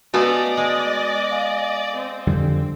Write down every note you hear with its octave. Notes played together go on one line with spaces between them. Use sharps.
A3 B3 F#4 D5 D#5 F5 G#5
G#3
F5 G#5
C4
F2 D3 G3